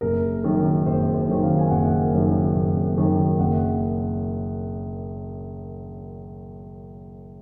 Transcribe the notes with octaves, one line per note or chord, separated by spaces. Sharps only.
F#1 A#4
F#2 D#3
F#1 C5
C5
F#2 D#3
F5
G#5
F#1 F#5
F#2 D#3
F#1
F#2 D#3
F#1 F#5